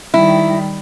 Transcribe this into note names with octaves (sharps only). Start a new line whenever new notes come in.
D#3 G3 E4